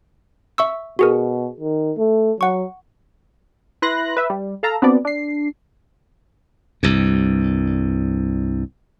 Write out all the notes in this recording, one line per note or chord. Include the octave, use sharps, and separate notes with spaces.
E5 C#6 E6
B2 F#4 G#4 A#4
D#3
A3
F#3 F#5 C#6
E4 B4 C6 F#6 A#6
B4 E5
G3
A4 F5 A5 A#5 E6
B3 C4 D4 F#4 D5
D4 C7
C2 G2